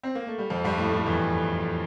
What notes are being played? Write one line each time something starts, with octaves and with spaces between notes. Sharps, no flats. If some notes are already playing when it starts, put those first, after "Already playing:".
C4
A#3
A3
G3
F2 F3
G2 G3
A2 A3
A2 A3
E2 E3